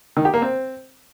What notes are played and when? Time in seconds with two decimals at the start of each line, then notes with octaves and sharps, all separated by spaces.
0.17 D#3
0.25 G4
0.34 A#3
0.42 C4